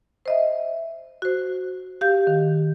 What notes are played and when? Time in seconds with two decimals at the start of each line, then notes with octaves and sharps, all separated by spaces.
0.26 C5 D#5 E5
1.22 F#4 C5
2.01 G4 F5 G6
2.27 D#3